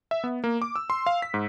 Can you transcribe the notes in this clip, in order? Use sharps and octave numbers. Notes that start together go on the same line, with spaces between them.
E5
B3
A#3
D6
E6
C6
F5
B6
G#2